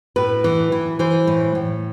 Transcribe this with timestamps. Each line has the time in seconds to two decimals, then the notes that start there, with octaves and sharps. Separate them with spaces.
0.16 A2 B4
0.44 E3
0.72 E3
0.99 E3 C5
1.27 A2
1.55 A2